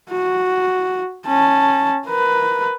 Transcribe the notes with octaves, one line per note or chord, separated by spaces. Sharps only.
F#4
C#4 A5
A#4 B4